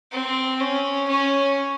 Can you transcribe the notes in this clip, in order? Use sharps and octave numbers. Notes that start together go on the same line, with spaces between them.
C4
C#4
C#4